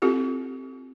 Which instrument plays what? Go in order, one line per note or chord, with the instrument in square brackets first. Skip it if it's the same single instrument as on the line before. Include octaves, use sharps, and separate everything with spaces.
[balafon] C4 E4 F4 G4 A4